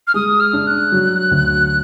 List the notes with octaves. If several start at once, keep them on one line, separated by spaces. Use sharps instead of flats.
F6
G#3 D#6
F6
D4
F#6
F#3
D2